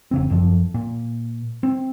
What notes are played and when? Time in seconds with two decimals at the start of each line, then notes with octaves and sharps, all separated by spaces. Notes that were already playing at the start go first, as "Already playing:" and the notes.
0.11 F1 C#3 C4
0.30 G1 F#2 F3
0.74 A#2
1.63 C4